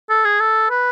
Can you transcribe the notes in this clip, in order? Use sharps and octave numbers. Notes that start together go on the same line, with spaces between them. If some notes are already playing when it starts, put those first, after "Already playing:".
A4
G#4
A4
B4